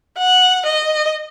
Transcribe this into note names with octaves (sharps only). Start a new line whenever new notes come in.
F#5
D#5